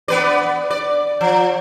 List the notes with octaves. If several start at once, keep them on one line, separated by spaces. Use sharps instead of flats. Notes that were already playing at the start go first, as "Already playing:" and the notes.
B3 B4 D5
D5
F3